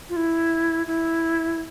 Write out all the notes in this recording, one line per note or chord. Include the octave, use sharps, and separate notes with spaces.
F4
E4
E4